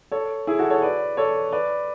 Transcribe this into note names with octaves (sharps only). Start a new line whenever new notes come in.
A4 C#5
E4 G#4
F#4 A4
A4 C#5
B4 D5
A4 C#5
B4 D5